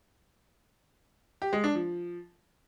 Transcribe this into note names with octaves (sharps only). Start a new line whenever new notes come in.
G4
G#3
D4
F3